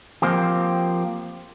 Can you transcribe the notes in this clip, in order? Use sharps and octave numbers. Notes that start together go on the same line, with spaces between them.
F3 A#3 C4 G4